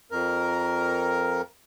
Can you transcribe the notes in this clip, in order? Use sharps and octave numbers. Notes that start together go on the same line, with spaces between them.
F2 A#4